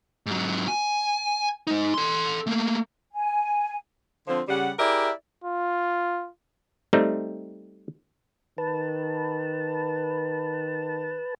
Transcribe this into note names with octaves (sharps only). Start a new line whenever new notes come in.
G#2 F#3
G#5
G#3 D#4
A4 C6
A3 A#3
G#5
D3 F3 C4
C#3 G3 F#5
E4 G4 G#4 A#4 D5 E5
F4
G3 A3 C4 D#4
D#3 B4 A5